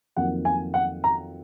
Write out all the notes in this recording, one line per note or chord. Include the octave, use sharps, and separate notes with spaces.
F2 D#3 F#3 A#3 F#5
G#5
F#5
A#5